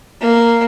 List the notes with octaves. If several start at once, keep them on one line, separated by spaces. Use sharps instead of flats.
A#3